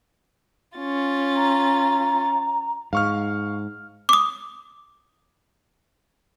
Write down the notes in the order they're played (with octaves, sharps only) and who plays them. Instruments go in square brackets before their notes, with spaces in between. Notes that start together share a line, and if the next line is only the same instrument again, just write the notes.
[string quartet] C#4 F4 A6
[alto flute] A#5
[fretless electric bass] G#2 [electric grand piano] F5 C#6 F6
[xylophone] D6 D#6